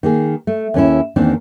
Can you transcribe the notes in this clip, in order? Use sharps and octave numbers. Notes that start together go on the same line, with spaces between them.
D#3 A#3 G#4
A3
D#2 C#4 E4
E2 D#3 A#3 C4 D4